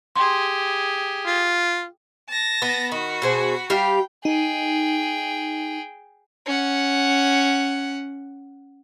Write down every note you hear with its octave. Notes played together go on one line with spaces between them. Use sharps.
G4 G#4 C6
F4
A5 A#6
B3
D#3 F#4 B5
B2 G#4 C5
G3 G4 F5 G5
D#4 G#4 G5
C#4 F#5